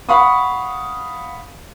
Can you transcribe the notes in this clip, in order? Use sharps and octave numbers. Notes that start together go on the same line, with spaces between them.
F5 F#5 B5 C#6 D#6